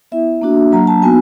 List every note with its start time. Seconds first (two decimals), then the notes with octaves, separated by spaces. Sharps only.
0.12 B3 E4 E5
0.42 A#3 D4 F#4
0.72 F#3 A#3 D4 A#5
0.87 A5
1.02 B3 D#4 F#4 G#5